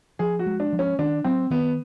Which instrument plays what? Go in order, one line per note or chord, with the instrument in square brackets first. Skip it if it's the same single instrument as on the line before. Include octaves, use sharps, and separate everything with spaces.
[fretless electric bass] F3 [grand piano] G#4
[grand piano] F#4
[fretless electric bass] G#3
[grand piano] D4
[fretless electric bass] F3
[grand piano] C#4
[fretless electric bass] D#3 [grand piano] D4
[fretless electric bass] F#3 [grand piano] C4
[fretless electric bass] D#3 [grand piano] B3